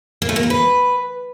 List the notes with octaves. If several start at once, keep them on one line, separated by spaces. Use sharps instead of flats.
A#3
A3
A#3
A#4
B4